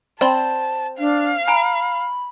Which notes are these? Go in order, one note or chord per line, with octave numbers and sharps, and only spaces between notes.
C4 D5 A5 B5 C6
D4 F5
G#5 A#5 B5 D7